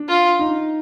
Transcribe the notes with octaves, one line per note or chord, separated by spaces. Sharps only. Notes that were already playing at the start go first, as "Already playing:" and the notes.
Already playing: D4
F4
D#4